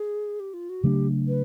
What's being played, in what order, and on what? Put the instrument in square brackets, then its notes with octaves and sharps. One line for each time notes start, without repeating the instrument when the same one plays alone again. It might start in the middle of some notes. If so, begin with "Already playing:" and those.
Already playing: [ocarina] G#4
G4
F4
F#4
[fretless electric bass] C#3 F#3 A3 D4 [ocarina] G4
[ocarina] B4